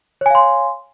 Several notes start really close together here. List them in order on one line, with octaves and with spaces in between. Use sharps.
C#5 G#5 F5 C6